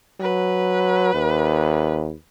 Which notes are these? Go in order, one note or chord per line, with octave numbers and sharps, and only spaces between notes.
F#3 B4
D#2